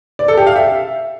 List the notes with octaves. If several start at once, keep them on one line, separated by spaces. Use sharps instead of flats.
D5
A4
G4
F5
E5